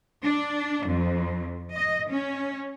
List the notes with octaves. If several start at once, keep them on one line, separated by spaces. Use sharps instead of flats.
D4
F2
D#5
C#4